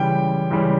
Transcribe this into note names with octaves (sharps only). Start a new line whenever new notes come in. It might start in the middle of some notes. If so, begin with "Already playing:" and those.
Already playing: C#2 C#3 E3 G3 G5
C#2 C#3 E3 G3